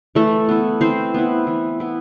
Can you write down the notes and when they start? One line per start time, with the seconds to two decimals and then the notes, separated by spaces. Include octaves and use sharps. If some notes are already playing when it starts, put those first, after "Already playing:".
0.15 E3 A3 A4
0.49 B3 E4
0.81 E3 C4 C5
1.14 B3 E4
1.47 E3
1.80 B3 E4